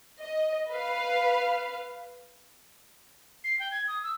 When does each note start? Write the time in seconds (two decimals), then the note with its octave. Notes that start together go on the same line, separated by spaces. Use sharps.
0.21 D#5
0.70 B4 F5
3.44 C7
3.59 G5
3.71 G#6
3.88 D#6
4.03 E6